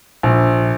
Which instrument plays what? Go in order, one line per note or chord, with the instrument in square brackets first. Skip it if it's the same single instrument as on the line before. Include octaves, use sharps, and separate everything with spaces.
[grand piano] A#1